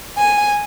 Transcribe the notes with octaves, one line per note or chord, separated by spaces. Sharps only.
G#5